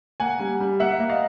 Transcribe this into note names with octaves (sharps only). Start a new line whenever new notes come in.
A#3 F#5 G#5
G3
G3
A#3 E5 F#5
A#3
D#5 F5